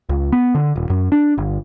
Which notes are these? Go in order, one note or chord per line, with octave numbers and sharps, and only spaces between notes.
C#2
B3
D3
D#1
F#2
D4
G1